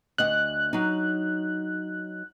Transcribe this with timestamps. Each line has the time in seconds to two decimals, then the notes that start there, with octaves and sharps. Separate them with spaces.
0.18 D2 D#5 F#5 F#6
0.73 F#3 D#4